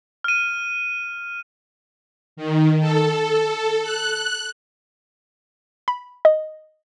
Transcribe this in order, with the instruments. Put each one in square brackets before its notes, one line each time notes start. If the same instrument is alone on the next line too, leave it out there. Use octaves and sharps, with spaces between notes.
[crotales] F6 D#7
[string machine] D#3
A4
F#6
[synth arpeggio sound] B5
D#5